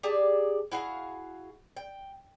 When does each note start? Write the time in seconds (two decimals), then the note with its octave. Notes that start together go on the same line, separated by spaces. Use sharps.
0.03 G4 G#4 D5 A5
0.71 E4 F#4 G#4 F5
1.77 G5